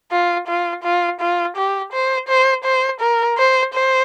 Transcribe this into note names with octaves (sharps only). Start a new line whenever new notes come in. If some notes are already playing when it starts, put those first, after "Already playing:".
F4
F4
F4
F4
G4
C5
C5
C5
A#4
C5
C5